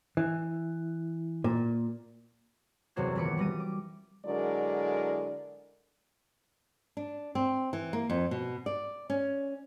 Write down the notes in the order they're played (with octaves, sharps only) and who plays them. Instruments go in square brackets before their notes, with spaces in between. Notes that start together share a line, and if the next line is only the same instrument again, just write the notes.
[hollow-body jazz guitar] E3
A#2
[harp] F#1 E2 C3 F#4 C5 G#6
D#1 E3 B3 B5 D6 C#7
E3 G3 A#6 D#7
D6
[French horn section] D3 F#3 G#3 E4 A#4 D5
[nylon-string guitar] D4
C4
E3
A#3
F2
B2
D5
C#4